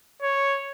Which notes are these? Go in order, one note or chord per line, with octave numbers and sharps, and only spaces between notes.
C#5